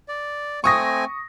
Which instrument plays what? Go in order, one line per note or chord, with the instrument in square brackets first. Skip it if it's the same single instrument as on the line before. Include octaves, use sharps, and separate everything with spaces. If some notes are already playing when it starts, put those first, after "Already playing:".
[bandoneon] D5
[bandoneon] A3 C4 G#5 [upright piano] C#6 D#6 A#6